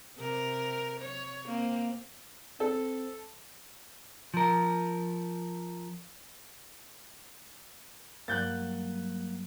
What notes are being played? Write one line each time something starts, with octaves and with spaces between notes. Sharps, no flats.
C3 A#4
C#5
A#3 C4
C4 A4
F3 A#4
G2 F#3 A#3 F#6 G6 A6